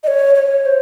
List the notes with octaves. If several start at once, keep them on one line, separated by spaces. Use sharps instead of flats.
D#5
C#5
C#5
C5